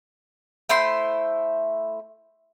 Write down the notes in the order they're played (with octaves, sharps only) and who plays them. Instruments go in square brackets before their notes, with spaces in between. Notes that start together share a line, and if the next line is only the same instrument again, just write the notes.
[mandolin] A3 E4 C5 C6